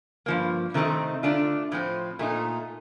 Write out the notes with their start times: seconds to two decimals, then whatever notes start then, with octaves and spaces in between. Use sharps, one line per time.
0.26 G2 F3 A#3
0.74 C3 D#3 A3 C4 D#4
1.23 D3 A3 D4 F4
1.72 A2 F3 C4
2.19 A#2 A3 D#4